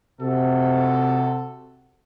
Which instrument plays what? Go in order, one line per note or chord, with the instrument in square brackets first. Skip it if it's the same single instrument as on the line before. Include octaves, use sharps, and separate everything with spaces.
[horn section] C3 F#4 A4